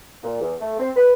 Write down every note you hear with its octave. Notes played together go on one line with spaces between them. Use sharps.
A#2
E2
A3
C4
B4